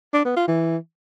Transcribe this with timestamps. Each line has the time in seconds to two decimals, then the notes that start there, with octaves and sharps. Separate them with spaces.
0.13 D4
0.25 B3
0.36 F4
0.48 E3